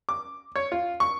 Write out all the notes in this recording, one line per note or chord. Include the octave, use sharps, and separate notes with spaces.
D6
C#5
F4
C#6